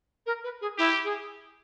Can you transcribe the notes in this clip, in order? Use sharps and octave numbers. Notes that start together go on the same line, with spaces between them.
A#4
B4
G#4
E4 G4
G#4